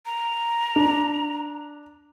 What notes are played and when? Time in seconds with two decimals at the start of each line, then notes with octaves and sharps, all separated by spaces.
0.06 A#5
0.76 D4